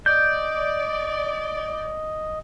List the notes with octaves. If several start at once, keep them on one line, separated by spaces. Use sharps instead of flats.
D5 D#5 G6